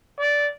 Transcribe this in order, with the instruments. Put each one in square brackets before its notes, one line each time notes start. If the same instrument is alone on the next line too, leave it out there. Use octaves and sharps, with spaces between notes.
[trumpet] D5